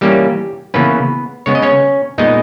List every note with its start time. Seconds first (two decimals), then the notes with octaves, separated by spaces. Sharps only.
0.01 E3 G3 A#3 C#4 G4
0.74 C#3 E3 A#3 B3 C#4 B4
1.46 C#3 G#3 B3 C#5
1.55 D#5
1.62 C#4 C#5
2.18 A#2 G#3 B3 D#4 D#5